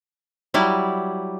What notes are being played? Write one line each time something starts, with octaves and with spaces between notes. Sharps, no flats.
F#3 G3 E4